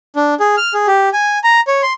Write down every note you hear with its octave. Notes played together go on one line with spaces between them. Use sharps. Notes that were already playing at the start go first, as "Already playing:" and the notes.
D4
G#4
F6
G#4
G4
G#5
A#5
C#5
C6